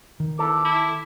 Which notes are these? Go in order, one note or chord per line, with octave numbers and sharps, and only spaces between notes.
D#3
E2 A4 D6
E4